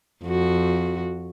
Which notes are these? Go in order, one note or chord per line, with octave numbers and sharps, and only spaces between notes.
F2 F#4